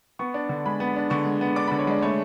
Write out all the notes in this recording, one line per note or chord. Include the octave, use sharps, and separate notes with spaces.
B3 C#6
D4
D3
G#3 B5
B3
D4
D3 C#6
G#3
B3
D4 D6
B5
D3
C#5
G#3 D5
A3 C#5